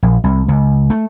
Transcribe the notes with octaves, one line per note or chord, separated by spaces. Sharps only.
A#1
C2
C#2
A3